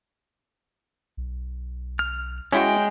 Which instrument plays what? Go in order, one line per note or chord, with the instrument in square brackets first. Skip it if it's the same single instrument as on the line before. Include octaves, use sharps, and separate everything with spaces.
[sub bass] B1
[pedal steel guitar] F6
[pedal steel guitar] G#3 [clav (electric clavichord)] C#4 E4 F#4 [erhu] G5